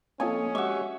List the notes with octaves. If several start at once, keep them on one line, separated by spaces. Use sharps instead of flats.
F3 A#3 C4 C#4 A4 C#5 D#5 G#5
G#3 F#4 G4 E5 C#6